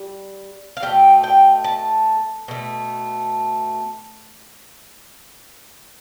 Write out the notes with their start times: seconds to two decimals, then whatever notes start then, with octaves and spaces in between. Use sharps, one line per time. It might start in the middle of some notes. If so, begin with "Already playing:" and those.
Already playing: G3
0.77 F5
0.82 B2 A3 G5
1.24 G5
1.64 A5
2.48 B2 A3